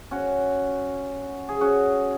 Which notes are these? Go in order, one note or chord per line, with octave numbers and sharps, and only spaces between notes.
C#4 F#4
G#4
C#4 F#4